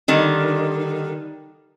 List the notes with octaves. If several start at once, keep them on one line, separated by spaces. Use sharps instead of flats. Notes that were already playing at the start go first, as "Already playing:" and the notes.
D3 D#3 G3